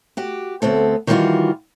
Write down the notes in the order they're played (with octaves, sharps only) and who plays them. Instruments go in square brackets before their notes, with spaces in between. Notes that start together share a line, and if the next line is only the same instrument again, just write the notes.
[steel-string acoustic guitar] F#4 G4
D2 B3 C4 A4
D#3 E3 G3 D4 F4 F#4